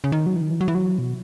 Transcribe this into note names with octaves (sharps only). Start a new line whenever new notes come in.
C#3
D#3
F#3
E3
D#3
E3
F#3
E3
F#3
B2